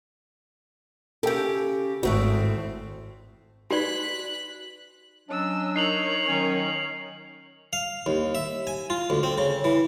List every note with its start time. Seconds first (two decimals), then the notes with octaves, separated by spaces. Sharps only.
1.23 C#3 G4 A4 A#4 G5
2.03 G#1 A2 A3 C4 F#4
3.71 D#4 F#4 B4 D5 B5 F#6 B6
5.29 F#3 C#4 D4 D#5 E6
5.76 D#4 A#4 C#5 C7 F7 F#7
6.28 D#3 F#3 C#4
7.73 F5
8.06 D#2
8.35 E5
8.67 G#5
8.90 F4
9.10 D2
9.23 C4
9.38 C#3
9.64 E3